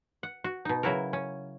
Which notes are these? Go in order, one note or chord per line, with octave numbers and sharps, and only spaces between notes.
F#5
F#4
B2 D#4
C#3 F#3 E4 F#4 A#4
C#4